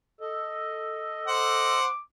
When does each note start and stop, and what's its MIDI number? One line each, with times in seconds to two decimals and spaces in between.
0.21 1.79 69
0.21 1.79 75
1.27 1.87 72
1.27 1.87 78
1.27 2.02 86